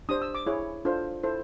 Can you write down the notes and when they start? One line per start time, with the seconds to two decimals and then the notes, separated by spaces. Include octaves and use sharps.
0.09 D4 G4 C5 D#6
0.22 E6
0.35 D6
0.46 E4 G#4 C#5
0.85 D4 F4 A4 C5
1.23 E4 A4 C5